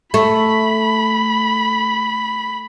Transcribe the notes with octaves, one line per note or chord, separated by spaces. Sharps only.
A3 B5